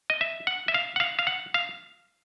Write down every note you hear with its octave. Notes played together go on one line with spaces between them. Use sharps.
D#5
E5
F#5
E5
F5
F#5
F5
F5
F#5
F5